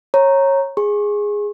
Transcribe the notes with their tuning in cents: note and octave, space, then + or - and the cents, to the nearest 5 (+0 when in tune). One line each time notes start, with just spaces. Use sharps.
C#5 -20 A#5 +0
G#4 -5 C#6 -40